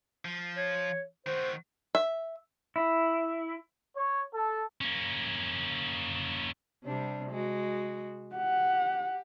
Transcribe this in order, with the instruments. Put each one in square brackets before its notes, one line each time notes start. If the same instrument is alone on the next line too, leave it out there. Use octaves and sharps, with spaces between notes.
[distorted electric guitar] F3
[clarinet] C#5
[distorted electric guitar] D#3 F#4 [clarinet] C5
[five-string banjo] E5
[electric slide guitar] E4
[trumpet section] C#5
A4
[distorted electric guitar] A#3 C#4
[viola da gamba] C3 G3 D4
G#3 F#4
[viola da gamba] G4 [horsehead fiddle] F#5